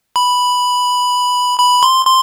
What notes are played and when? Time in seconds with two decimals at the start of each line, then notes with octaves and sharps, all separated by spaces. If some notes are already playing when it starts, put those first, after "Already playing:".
0.16 B5
1.59 B5
1.83 C6
2.06 C6